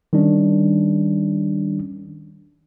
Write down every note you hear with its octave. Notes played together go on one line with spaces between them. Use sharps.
D#3 G3 C#4 D4